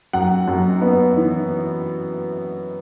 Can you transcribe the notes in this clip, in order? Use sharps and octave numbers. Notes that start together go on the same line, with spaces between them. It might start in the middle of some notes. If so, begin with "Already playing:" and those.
F#2 F#5
F#2
B3
E3